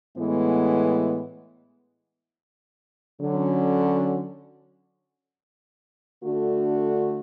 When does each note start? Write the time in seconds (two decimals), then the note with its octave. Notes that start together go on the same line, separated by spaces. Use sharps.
0.17 A2 E3 G#3 B3
3.21 D3 F#3 C#4
6.24 D3 A3 D4 F#4